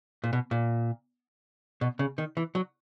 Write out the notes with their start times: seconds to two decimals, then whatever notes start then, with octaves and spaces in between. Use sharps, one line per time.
0.24 A#2
0.33 B2
0.51 A#2
1.81 B2
1.99 C#3
2.18 D#3
2.37 E3
2.55 F#3